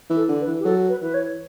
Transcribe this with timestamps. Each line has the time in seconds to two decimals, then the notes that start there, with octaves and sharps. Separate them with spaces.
0.10 E3
0.16 A4
0.29 D3
0.41 B4
0.47 E3
0.60 G4
0.65 F#3 A4
0.89 B4
1.02 E3 B4
1.14 C#5